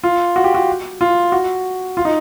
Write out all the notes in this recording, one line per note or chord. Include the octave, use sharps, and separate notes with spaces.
F4
F#4
G4
F#4
F4
F#4
F4
D#4